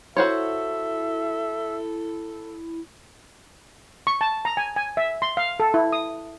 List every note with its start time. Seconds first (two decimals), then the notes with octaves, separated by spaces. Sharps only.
0.17 E4 F#4 A4 C5 C#5 E5
4.07 C#6
4.21 A5
4.45 A#5
4.57 G#5
4.76 G#5
4.97 E5
5.22 C6
5.37 F5
5.60 A4
5.74 E4
5.92 D#6